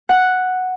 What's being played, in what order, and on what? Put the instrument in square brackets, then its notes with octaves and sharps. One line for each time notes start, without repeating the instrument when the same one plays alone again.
[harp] F#5